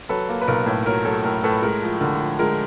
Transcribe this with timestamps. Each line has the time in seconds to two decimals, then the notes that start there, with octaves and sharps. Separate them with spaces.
0.09 F#3 A4 B4
0.29 A#3
0.42 B4
0.47 B1 A#4
0.66 A2
0.86 F#3 A#4
1.05 F#3 A4
1.24 A2 A#4
1.44 A2 A4 B4
1.62 G#3 A#4
1.82 F3
2.01 D3 A#4
2.20 F3
2.39 G#3 A#4